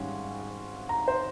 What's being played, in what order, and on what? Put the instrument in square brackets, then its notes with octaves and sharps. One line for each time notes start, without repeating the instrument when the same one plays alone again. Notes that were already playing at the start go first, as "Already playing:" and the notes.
Already playing: [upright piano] G#1 G#2 G3 C#4
A#5
C5